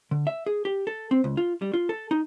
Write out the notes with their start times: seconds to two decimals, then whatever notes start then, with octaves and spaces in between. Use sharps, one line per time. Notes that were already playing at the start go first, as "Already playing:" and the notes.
0.11 D3
0.27 E5
0.46 G#4
0.65 G4
0.87 A4
1.11 C4
1.24 C#2
1.37 F4
1.62 G3
1.74 F4
1.89 A4
2.11 D#4